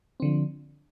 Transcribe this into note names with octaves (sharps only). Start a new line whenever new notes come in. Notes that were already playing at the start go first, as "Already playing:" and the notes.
D3 F3 C4